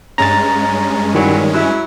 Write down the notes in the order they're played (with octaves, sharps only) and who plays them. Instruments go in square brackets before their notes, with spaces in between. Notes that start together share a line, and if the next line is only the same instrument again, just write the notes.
[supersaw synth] G2 G#3 C#4 [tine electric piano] A#5 A6
[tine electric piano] D#3 G3 [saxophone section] E3 F#3 E4
[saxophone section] F#3 E4